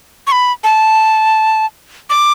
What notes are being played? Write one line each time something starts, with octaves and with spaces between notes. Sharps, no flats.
C#6
B5
A5
D6